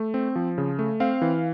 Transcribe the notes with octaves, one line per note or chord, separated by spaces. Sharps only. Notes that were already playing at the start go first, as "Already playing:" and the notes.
Already playing: A3
C4
F3
C#3
A3
C4 F5
E3